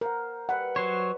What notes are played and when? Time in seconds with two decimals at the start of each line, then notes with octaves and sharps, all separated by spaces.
0.01 A#4 C5 F#5
0.49 G3 B4 F#5 E6
0.76 F#3 C5 C#5